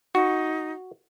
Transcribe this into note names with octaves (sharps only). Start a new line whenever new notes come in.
D#4 F#4